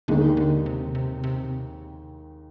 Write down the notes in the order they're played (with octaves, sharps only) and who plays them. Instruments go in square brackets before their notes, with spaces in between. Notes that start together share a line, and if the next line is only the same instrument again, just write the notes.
[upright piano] D#2 D#3 G#3 D#4 [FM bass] D3
[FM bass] D3
C3
C3
C3